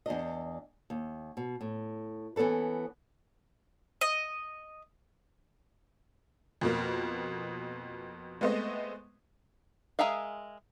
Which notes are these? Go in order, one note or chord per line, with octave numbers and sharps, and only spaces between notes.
E2 A#2 D4 D#5
D#2
B2
A2
E3 B3 C#4 A4 B4
D#5
F2 B2 A#3
G#3 A3 B3 C4 D#5
G#3 G#4 A#4 E5 F5